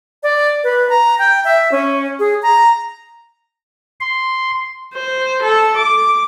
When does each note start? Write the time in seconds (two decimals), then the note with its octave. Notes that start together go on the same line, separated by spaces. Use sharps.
0.23 D5
0.64 B4
0.89 A#5
1.19 G5
1.45 E5
1.72 C#4
2.19 G#4
2.43 A#5
4.01 C6
4.94 C5
5.43 A4
5.77 D6